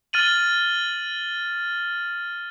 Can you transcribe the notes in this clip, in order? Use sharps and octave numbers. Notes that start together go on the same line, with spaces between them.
F6 A6 D#7 F#7